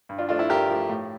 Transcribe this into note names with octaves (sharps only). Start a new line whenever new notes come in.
G2
D4 F4
F3 A3 D4 F4
E4
G2 G4 A#4
F3 A3
A2